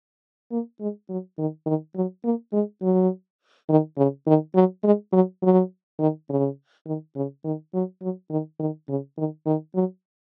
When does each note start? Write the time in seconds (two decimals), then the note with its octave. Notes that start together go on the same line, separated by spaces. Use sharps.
0.51 A#3
0.81 G#3
1.09 F#3
1.38 D#3
1.66 D#3
1.96 F#3
2.24 A#3
2.53 G#3
2.82 F#3
3.69 D#3
3.98 C#3
4.27 D#3
4.55 F#3
4.84 G#3
5.13 F#3
5.43 F#3
5.99 D#3
6.29 C#3
6.86 D#3
7.16 C#3
7.45 D#3
7.74 F#3
8.02 F#3
8.30 D#3
8.60 D#3
8.89 C#3
9.18 D#3
9.46 D#3
9.75 F#3